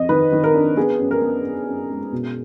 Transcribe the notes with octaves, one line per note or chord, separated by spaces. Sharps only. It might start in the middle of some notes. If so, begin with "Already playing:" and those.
Already playing: F2 D#5
D#3 B4
D#3
A#4
D4
B3 G#4
F#2
A#4
B3
B3
F#2
G#3
B2